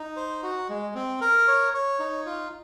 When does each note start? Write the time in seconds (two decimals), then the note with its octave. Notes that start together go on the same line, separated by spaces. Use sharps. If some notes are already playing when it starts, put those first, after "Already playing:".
Already playing: D#4
0.16 C5
0.43 F#4
0.69 G#3
0.95 C4
1.21 A#4
1.48 C#5
1.74 C#5
1.99 D#4
2.26 F4